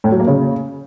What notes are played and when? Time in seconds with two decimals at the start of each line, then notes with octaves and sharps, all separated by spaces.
0.04 A2
0.12 F#3
0.20 A#3
0.27 C#3